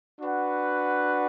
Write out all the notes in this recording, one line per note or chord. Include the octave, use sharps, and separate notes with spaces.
D4 F#4 B4 F#5